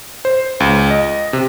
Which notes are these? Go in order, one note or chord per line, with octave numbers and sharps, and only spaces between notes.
C5
C#2
D#5
C3